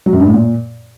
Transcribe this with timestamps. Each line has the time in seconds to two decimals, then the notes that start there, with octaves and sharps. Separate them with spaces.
0.06 F#3
0.13 F#2
0.20 G2
0.27 A2
0.34 A#2